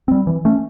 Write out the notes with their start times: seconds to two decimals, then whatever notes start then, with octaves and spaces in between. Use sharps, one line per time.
0.08 G3 C4
0.27 E3
0.45 A3 C#4